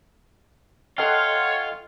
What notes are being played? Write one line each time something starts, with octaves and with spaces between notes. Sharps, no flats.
F4 A4 C#5 D#5 F#5 G5 C6 F6